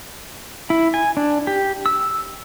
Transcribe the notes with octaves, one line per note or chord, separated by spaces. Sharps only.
E4
G#5
D4
G4
E6